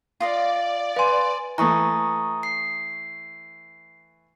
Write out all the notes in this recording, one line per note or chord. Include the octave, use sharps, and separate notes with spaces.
F4 D5 D#5 F5
B4 F5 G#5 C6
E3 A3 A#5 C#6 D#6
C7